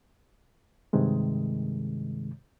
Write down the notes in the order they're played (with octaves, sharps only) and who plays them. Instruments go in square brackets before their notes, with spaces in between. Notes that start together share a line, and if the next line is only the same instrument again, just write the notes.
[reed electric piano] G2 C3 D#3 G#3